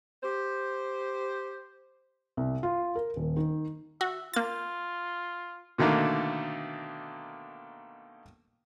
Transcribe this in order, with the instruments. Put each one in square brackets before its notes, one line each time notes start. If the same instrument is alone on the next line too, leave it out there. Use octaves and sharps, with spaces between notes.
[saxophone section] G4 C5
[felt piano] C2
F4
A#4
D#1
D#3
[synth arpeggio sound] F#4 [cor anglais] E5
[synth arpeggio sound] A#3 A6 [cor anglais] F4
[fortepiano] B2 D3 D#3 A3 A#3